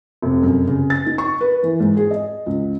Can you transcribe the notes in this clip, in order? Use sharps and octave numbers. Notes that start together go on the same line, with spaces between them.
F1
F#2
C#3
A6
D#4
C#6
B4
E3
G#2
G#4
D#5
C#2